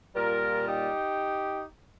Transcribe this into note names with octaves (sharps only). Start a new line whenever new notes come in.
A#2 G3 F4 A#4
D#4 G4